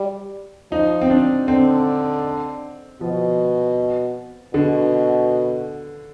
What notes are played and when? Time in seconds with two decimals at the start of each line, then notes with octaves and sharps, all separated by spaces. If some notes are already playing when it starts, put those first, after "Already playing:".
Already playing: G3
0.71 F3 D#4
1.01 C4
1.10 D4
1.48 D3 C4
3.01 B2 F3
4.54 B2 D3